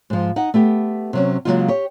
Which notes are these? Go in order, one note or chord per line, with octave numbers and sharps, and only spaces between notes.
G#2 F3
D#4 F#5
A3 B3 G4
C3 F#3 C#4
C#3 F3 F#3 G#3 A#3 F4
G4 C#5